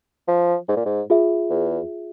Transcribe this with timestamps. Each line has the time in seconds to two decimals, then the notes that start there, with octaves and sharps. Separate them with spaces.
0.28 F3
0.68 G#2
0.77 A#2
0.86 G#2
1.10 F4 G#4 E5
1.50 E2